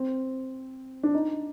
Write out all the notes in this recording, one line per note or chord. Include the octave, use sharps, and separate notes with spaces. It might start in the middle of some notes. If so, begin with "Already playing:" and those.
Already playing: C4
D4
D#4